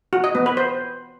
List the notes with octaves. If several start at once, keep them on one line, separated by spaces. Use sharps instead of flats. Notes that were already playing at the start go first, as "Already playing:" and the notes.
F#4
D#5
B3
B4
C5